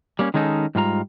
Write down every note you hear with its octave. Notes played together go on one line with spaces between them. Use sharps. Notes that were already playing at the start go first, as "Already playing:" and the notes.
G3 A#3 C#4
D#3 G#3 C#4 D#4 A4
G#2 G3 F4 A#5